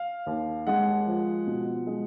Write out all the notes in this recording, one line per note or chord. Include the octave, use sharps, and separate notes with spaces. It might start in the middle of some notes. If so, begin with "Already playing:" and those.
Already playing: F5
D#2
G#3 F#5
F3
B2
G#3